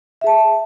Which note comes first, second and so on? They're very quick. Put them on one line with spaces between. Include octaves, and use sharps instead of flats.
E5 G#4 A5